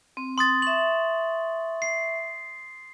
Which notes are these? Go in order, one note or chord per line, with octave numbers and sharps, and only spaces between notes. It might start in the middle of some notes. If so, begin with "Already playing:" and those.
C4
C6 D#6 A6
E5 C#6 F#7
C7